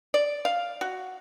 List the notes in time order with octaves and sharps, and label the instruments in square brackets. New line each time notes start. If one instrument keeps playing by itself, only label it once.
[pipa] D5
F5
F#4